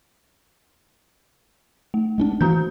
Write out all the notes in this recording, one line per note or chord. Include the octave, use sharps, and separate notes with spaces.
A3
G#3 C#4 D4
E3 A#3 F#4 A#5 G6